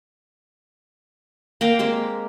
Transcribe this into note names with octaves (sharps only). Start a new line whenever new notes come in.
A#3 F5 G5 A#5
G#3 A#3 C4 G4